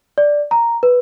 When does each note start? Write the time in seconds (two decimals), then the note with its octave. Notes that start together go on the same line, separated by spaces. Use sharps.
0.18 D5
0.51 A#5
0.83 B4